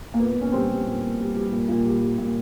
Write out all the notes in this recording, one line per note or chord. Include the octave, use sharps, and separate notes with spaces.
A#3
A#2 B3
A#2
C#4
G3 C4
G3
A#2
A#2
G3
G3
A#2
A#2
G3
G3
A#2